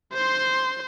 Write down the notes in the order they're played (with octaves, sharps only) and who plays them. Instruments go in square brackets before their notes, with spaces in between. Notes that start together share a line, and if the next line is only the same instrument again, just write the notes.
[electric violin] C5 C6